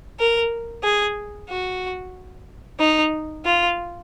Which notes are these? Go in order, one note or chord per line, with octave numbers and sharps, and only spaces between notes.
A#4
G#4
F#4
D#4
F4